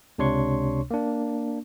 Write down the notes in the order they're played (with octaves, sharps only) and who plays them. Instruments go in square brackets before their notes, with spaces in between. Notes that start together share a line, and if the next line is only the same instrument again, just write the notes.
[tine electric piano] C#2 C3 D4 C#5 C6 C#6
A#3 D4